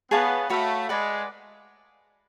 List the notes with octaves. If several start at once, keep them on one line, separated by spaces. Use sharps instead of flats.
B3 G#4 C#5 F5 A5
A3 F#4 C#5 F5 B5
G#3 B4 D5 F#5